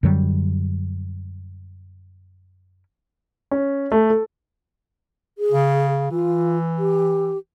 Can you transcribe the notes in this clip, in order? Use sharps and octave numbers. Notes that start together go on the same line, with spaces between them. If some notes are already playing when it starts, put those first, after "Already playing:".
F#2 D3 F#3 G3
C#4
A3
A4
G#4
C#3
E3 F4
G4